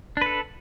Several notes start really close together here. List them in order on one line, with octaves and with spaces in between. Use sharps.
D4 B4 A4